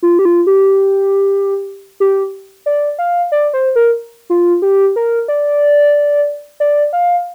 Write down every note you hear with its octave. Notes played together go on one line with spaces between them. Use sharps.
F4
G4
F4
G4
G4
D5
F5
D5
C5
A#4
F4
G4
A#4
D5
D5
F5